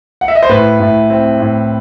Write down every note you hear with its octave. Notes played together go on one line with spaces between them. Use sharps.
F#5
E5
D#5
C5
A2 B4
A2
C4
A2